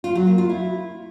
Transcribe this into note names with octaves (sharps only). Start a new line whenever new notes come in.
F4
F#3
A#3
F4
E4